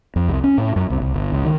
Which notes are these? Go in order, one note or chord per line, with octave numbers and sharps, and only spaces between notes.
F2
C2
C#4
A2
F#2
C2
C2
G1
C#2
D#3